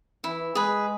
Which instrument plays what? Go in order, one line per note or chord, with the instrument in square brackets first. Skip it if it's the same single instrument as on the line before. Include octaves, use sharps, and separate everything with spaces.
[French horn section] E3 [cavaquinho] E4
[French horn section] G#3 [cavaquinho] G#4 B4